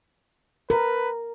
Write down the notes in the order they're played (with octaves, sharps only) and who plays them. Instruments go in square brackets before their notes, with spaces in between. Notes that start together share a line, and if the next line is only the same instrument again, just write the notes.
[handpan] A#4 [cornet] B4